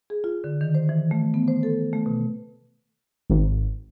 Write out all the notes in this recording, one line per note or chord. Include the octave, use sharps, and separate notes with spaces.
G#4
F4
D3
D#3
C5
E3
A3
B3
C5
A4
A3
B2
G#1